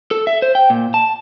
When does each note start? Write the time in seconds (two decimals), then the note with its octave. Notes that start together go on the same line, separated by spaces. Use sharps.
0.11 A4
0.27 E5
0.42 C5
0.55 G5
0.70 A#2
0.94 A5